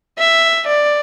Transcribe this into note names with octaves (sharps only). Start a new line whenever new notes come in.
E5
D5